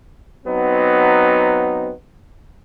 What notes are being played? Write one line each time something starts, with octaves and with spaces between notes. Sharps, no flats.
F#3 B3 C4 D#4